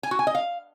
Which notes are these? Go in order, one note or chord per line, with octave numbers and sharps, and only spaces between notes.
G#5
F#4
G#5
D#5
F5